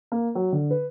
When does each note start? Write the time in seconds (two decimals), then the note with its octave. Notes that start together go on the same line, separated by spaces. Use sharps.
0.12 A#3
0.35 F#3
0.52 D3
0.71 B4